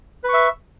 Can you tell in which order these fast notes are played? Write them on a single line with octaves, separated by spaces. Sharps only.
B4 C#6 E5